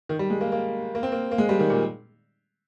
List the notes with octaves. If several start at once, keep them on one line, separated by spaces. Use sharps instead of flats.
D#3
G3
G#3
A#3
A#3
A#3
C4
A#3
A#3
G#3
G3
D#3
A#2